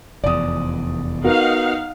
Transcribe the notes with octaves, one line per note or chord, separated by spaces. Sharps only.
F1 E2 D5 D#6
B3 D#4 F#4 A#4 F5 F#5